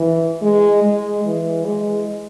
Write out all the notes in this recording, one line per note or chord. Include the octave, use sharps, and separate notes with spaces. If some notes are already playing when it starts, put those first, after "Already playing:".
Already playing: E3
G#3
G#3
E3
G#3